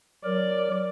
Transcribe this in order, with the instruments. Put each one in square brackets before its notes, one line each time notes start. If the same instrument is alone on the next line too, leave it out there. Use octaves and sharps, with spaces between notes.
[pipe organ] F#3 A#4 [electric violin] D5